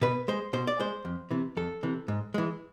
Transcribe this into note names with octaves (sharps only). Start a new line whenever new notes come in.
B2 B4
G#3 C5
B2 C5
D5
G#3 C5
F2
C3 E3
F2 A4
C3 E3
G#2
E3 G#3